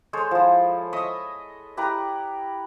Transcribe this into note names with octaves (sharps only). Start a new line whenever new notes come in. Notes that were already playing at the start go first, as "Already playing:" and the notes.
G#3 A4 C5 C#5
F3 E4
D#5 E5 C#6 D#6
E4 G4 B4 A#5